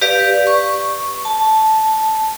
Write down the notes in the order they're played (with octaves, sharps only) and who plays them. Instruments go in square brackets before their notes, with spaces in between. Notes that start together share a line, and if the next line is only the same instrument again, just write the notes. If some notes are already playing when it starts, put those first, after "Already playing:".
[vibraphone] G4 B4 D5 F5
C#6
A5